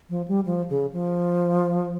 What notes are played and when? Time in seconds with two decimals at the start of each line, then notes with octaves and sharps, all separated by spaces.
0.10 F3
0.28 G3
0.46 F3
0.70 C#3
0.93 F3